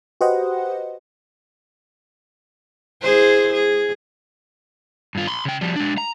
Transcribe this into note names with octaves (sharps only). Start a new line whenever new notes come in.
F#4 G4 B4 C5 D#5 F#5
E4 G#4 C5
G#4
G2 F4
B5 C6
C#3 G5
F3 G3
G#3 D4
A#5